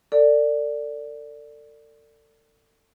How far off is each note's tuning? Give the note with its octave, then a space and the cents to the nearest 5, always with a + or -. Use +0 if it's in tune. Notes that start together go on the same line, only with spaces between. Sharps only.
A4 +40 D5 +0